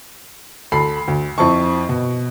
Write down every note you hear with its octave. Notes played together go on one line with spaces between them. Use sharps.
D2 A4 B5 C7
D2
F2 C4 E4 A5 C#6
B2